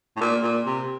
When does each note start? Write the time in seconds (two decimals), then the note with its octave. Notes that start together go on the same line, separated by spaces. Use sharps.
0.16 A2
0.21 A#2
0.43 A#2
0.66 C3